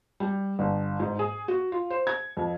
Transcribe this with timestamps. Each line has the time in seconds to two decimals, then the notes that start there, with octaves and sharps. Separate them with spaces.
0.20 G3
0.59 G1
1.00 G#2
1.19 G#4
1.48 F#4
1.72 F4
1.90 C5
2.07 G#6
2.37 F2